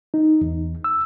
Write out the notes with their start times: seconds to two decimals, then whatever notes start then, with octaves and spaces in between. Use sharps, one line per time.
0.14 D#4
0.41 E2
0.84 E6